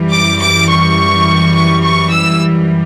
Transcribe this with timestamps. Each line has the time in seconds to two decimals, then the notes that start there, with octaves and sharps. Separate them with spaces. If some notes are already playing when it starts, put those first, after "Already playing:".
Already playing: F#2 E3 G3
0.12 D6
0.40 D6
0.70 C#6
1.55 C#6
1.82 C#6
2.11 E6